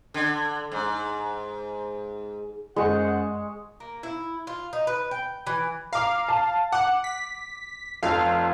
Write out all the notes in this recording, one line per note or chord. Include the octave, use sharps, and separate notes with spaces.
D3
G#2
F#2 G#3 C5 F#5 C#6
A#3
E4
F4
D#4
B4
G5
E3
F5 A#5 D6
A5
F#5 D6
B6
F1 F2 F5